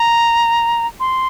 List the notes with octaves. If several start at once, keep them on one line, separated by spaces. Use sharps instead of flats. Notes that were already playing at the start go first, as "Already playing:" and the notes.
Already playing: A#5
C6